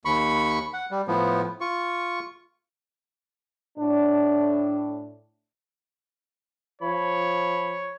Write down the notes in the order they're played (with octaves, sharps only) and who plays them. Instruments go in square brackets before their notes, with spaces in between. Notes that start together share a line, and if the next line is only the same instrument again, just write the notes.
[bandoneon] D#2 B5 C#6
F#5
G3
A2 F3 B3
F4 C#6
[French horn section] A2 D4
[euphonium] F3 [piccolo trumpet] C#5 [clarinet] B5